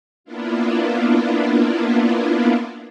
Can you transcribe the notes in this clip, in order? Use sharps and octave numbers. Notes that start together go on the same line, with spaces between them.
A#3 B3 D4 E4 F4